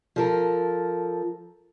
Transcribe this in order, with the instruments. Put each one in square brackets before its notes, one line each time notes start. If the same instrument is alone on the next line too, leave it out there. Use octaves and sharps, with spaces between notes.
[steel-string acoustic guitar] F3 A4 A#4